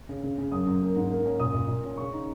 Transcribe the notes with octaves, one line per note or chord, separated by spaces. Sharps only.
C#3
C#3
C#3
F#2 D#6
F#2
A#3
G#2
A#3
C#4
A#2 D#6
A#2
A#2
C#4
C#3 C#6
D#4